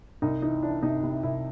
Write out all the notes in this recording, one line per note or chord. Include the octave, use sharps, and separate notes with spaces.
C2 D#4
E3 D#4
E3 D4
C3 D#4
C3 E4
C2 E4